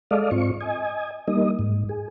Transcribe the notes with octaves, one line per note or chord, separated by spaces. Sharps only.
G#3 A4 D5 D#5 F5
G#2 C4 F4 C#6
D#5 G#5
G3 A#3 D#4 D#5
G#2
G#4